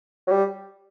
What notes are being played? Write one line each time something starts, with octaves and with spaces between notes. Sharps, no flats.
F#3
G3